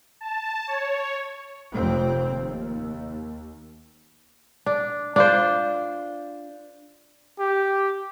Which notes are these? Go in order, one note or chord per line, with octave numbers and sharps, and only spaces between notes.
A5
C#5
F1 F2 C4
D#2
D4
D4 F4 C5
G4